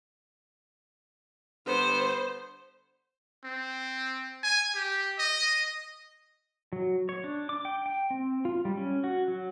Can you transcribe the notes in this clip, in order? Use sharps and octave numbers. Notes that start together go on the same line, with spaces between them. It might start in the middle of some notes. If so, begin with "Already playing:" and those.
D3 G3 B3 C5
C4
G#5
G4
D#5
F#3
C#5
D4
D6
G5
G5
C4
F4
G3
C#4
F#4
F#3